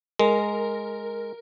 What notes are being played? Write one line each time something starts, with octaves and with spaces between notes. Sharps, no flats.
G#3 A#4